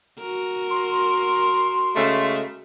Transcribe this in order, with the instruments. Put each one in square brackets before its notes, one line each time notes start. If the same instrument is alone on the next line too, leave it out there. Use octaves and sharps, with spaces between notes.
[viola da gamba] F#4 A#4
[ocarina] C6
[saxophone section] C#3 G#3 A3